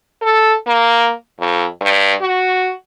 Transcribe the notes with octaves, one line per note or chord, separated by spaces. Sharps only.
A4
A#3
F2
G2
F#4